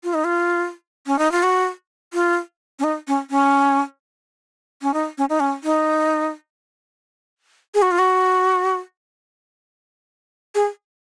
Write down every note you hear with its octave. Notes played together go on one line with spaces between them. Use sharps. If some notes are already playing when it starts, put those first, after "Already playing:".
F4
D#4
F4
C#4
D#4
F4
F#4
F4
C#4
D#4
C#4
C#4
C#4
D#4
C#4
D#4
C#4
D#4
G#4
F#4
F4
F#4
G#4